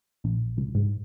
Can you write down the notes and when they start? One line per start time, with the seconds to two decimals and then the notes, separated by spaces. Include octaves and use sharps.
0.24 A#1
0.57 C#2
0.75 G#2